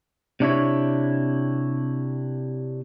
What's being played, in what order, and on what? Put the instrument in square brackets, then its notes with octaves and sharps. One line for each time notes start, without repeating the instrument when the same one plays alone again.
[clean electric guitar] C3 D4 E4 C#5